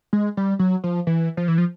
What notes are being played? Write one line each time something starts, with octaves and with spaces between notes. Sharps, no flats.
G#3
G3
F#3
F3
E3
F3
E3
F3